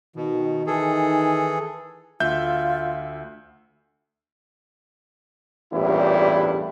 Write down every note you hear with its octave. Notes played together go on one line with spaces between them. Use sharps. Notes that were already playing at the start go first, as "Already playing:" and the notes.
B2 D#3
E3 G#4 A4
D2 F4 E5 G6
A1 E2 G2 A#2 G3 E4